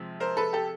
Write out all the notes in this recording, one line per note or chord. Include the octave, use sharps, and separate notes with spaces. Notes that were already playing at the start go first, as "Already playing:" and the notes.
Already playing: C3 F3 G#3
A#4 C5
A4 B4
G4 A4